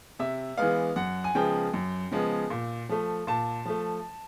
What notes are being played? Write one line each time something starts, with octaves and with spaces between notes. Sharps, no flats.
C3 E5
E3 G#3 B3 F5
F#2 F#5
G#5
C#3 F3 G#3 B3 G5
F#2
C#3 F3 G#3 B3
A#2
F3 A3
A#2 A5
F3 A3